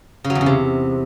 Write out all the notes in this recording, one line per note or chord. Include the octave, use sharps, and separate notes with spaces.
C#3
F#3
E2
C#3
C3